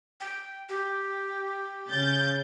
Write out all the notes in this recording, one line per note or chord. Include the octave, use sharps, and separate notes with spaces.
G5
G4
C#3 G6 A6